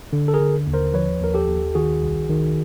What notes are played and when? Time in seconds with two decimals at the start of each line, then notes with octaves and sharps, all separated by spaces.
0.13 D3
0.28 A4
0.34 G#4 A#4
0.40 D3
0.67 D#2
0.74 A#4 C5
0.94 F3 B4 C#5
1.21 D#2 A#4
1.34 G4 A4
1.48 D#2
1.75 D#3 F#4 G#4
2.03 C2
2.30 D#3